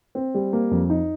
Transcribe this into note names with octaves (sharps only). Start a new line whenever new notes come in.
C4
G3
A#3
F2
D#4